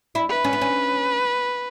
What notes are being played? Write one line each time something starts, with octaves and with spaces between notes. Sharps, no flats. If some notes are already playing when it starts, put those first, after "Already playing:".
E4
B4
C#4
B3
C#4